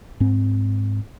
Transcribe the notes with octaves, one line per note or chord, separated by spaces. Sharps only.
G#2 C4